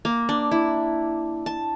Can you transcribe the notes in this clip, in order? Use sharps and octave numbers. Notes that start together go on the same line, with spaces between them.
A#3
D4
E4
A5